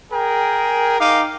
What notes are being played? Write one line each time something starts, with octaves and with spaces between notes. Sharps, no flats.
G#4 A#4 G5
D#4 F5 D6